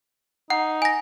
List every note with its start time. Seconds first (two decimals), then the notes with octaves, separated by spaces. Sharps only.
0.50 D#4 F#5
0.82 G#5 A#6